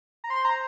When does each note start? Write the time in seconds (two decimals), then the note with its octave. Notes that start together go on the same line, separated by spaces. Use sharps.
0.24 A#5
0.30 C5 C6
0.45 A#5